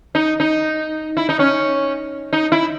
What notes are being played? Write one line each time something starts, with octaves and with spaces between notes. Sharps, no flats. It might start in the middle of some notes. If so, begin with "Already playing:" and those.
D#4
D#4
E4
D#4
C#4
D#4
E4